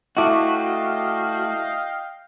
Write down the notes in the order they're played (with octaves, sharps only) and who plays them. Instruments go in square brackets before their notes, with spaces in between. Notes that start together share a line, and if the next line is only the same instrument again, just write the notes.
[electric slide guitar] A3 F#4 [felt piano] E4 D6 [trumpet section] D#5 F5 G5